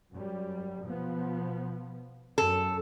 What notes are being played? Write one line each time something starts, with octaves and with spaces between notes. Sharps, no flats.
F#2 G3
B2 F3 B3
F#2 A4